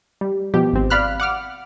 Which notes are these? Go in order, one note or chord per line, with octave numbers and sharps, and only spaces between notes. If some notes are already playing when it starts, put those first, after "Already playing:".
G3
B2 F3 G4
G#1 C4
D5 F5 B5 F6 F#6
F#5 D6 F6